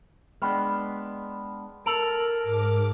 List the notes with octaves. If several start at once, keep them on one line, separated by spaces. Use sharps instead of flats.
G#3 B3 D4 G5 B5 F6
A4 A#4 D7 F7 F#7
G#2 D6